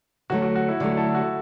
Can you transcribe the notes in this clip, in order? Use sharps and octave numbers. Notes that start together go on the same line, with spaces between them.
D3 F#3 A3 F#4
F#4
F#4
E4
D3 F#3 A3 F#4
E4 A4
F#4